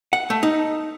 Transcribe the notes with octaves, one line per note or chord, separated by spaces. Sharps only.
F#5
A3
D#4